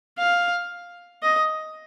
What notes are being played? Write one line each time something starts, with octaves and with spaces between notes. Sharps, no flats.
F5
D#5